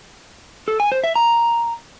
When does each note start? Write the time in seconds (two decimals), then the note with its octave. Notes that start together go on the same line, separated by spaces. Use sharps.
0.68 A4
0.80 G#5
0.92 C5
1.04 E5
1.16 A#5